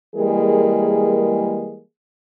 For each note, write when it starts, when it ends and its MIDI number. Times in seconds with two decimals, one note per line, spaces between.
0.16 1.81 52
0.16 1.81 55
0.16 1.81 56
0.16 1.81 58
0.16 1.81 68
0.16 1.81 70